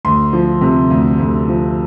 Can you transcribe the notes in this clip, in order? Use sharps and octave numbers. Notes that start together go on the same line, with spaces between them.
D2 C6
F3
C3
D2
D2
F3